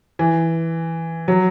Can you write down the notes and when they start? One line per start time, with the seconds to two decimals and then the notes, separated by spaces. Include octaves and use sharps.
0.19 E3
1.28 F#3